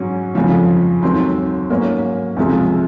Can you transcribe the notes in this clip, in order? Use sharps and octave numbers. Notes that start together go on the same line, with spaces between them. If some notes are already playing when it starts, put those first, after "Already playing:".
Already playing: G#2 F#3 C#4
F2 C#3 F3
D#2 D#3 F#3 C4
G#2 F#3 A#3 C#4
C#2 C3 F3 G#3 C4